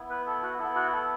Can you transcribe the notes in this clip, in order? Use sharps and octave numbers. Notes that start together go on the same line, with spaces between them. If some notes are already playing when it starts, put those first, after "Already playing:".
Already playing: B3 E4
B4
A4
F#4
B3 E4 A4
F#4
A4